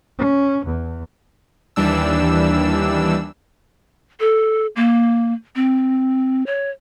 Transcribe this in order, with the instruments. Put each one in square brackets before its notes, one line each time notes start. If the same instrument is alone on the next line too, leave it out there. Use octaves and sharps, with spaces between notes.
[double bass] C#4
E2
[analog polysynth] D#2 E3 G3 D4 E6
[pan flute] A4
A#3
C4
C#5